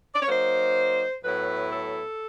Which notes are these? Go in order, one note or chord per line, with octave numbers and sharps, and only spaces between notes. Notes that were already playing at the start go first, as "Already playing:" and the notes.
D5
C#5
F#3 A#3 D#4 C5
A2 F#3 B3 E4 B4
A4